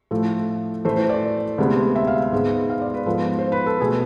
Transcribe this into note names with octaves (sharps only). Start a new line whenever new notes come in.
A2 F3 A3 A4
A2 E3 A3 C5
C5
D5
D2 C3 G#3 B3
E5
F5
G#2 G#3 B3
F5
D5
B4
G#2 F3 B3 A4
C5
B4
A4
B2 A3 G#4